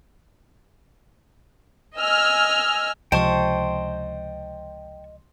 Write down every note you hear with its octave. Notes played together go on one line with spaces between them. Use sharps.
D#5 G#5 E6 F6
C#2 C3 F3 C5 D#5 G5 A5 C#6